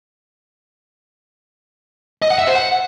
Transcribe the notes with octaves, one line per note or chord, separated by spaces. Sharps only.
D#5
F#5
E5
C5
F#5